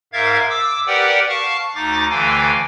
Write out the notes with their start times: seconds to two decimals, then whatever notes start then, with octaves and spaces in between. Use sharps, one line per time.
0.13 G#2 A#4 E5 F5 G#6 A6
0.50 D6 E6
0.87 G4 A#4 B4 D5 F#5 G5
1.29 F5 A5 C#6 F6
1.75 D2 D#4 D6 A6
2.11 D2 D3 E3 F5 G5 G#5